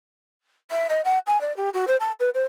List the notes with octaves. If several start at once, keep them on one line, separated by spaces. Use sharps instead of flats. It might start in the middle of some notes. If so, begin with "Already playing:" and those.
E5
D#5
F#5
G#5
D5
G4
F#4
C5
A5
B4
C5